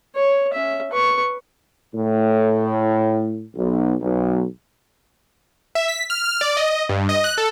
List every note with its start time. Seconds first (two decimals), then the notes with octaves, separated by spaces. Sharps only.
0.15 C#5
0.53 C#4 E5
0.91 B4 C#6
1.95 A2
3.56 B1
4.02 B1
5.75 E5
5.88 B6
6.10 F6
6.24 F6
6.41 D5
6.57 D#5
6.89 G2
7.09 D#5
7.24 F#6
7.38 A4